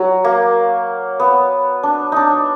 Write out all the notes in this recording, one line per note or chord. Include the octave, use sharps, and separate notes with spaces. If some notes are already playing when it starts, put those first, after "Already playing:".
Already playing: F#3
A#3
B3
D4
D4 D#4